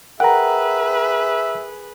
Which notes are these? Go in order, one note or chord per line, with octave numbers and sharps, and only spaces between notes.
G#4 A#4 B4 E5 F#5 G5 A#5